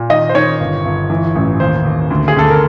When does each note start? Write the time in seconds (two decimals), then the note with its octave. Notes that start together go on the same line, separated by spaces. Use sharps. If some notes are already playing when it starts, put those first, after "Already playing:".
Already playing: A#2
0.09 D#3 D#5
0.29 C5
0.35 D#3 C#5
0.60 G1
0.85 G1
1.10 E3
1.36 A1
1.60 D#2 C5
1.85 D#2
2.10 D2
2.28 G#4
2.36 D2 A4
2.50 A#4